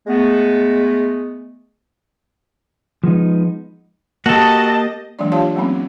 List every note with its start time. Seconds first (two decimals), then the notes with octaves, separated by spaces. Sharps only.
0.07 G#3 A3 B3
3.04 F3 G#3 B3 D#4
4.26 A#3 F#4 G4 A4 D#5 A5
5.19 E3 F#3 G#3 A#3 D4 D5
5.32 D4 F4 G4 C#5 F5 A5
5.56 F#3 A3 A#3 C4 C#4